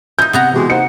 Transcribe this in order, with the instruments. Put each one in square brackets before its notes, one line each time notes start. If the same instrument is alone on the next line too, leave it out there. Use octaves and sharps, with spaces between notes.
[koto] D#4 E4 [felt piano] G6
[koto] C3 B3 A#5 [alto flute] F#5
[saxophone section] B2 E3 G#3 [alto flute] G4
[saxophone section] A#3 D#4 C5 [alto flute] F#5 [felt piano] C#7